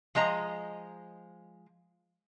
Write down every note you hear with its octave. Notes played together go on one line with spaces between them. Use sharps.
F3 G#3 D#5 A#5